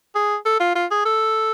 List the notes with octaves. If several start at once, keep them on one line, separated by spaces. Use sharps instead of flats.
G#4
A4
F4
F4
G#4
A4